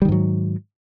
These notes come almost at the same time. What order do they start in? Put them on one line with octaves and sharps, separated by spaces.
G3 D#3 G#2 F#3